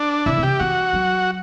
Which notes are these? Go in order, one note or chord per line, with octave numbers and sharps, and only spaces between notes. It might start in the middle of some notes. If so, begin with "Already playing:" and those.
Already playing: D4
C3 E4
C3
G4
E3 F#4
F#3